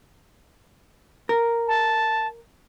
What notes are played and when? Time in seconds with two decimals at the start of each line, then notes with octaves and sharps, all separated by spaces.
1.29 A#4
1.67 A5